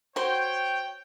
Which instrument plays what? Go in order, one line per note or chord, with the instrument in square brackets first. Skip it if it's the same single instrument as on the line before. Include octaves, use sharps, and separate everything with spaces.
[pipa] F#4 C5 [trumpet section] C#5 G5